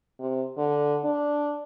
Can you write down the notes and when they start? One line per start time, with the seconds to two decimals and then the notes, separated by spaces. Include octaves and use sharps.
0.20 C3
0.58 D3
1.04 D4